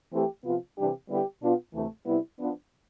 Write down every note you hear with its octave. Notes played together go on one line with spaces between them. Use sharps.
E3 A3 C4 E4 G4
C3 F3 B3 F4
C3 E3 G3 D4 G4
D3 G3 B3 E4 G4
B2 B3 D4 F4
D2 C3 E3 A3
C3 G3 B3 E4
F3 B3 D4